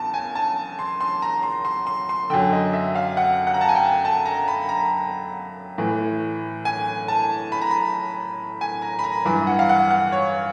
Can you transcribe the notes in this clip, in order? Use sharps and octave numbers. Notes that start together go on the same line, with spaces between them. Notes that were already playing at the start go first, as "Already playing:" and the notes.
Already playing: E2 C#3 A5
G#5
A5
C6
C6
A#5
C6
C6
C6
C6
F#2 D3 G5
D#5
E5
F5
F#5
F#5
A#5
A5
G#5
G5
A5
A#5
B5
A#5
A2 E3
G#5
A5
B5
A#5
B5
G#5
A#5
B5
A#5
G2 E3 B5
F#5
F5
F#5
F#5
C#5